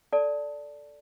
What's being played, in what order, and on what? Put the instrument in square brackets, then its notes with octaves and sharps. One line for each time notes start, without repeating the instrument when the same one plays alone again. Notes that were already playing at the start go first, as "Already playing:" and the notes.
[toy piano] A4 D5 A5